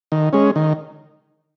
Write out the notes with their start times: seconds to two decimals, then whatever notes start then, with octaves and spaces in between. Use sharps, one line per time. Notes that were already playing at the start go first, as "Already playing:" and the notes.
0.12 D#3
0.33 G#3 C#4
0.56 D#3